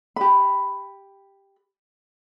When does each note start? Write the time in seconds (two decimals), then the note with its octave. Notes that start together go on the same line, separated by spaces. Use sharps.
0.16 G4 B5